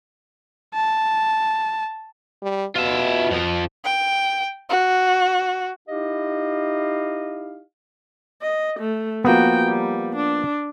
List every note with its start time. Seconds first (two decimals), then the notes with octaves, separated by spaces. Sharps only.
0.74 A5
2.42 G3
2.76 B2 F4 E5
3.31 F2 F3
3.84 G5
4.70 F#4
5.88 D#4 E4 G4 D#5 F5
8.42 D#5
8.79 A3
9.24 F3 A#3 B3 F#4 G5
9.68 G3
10.16 D4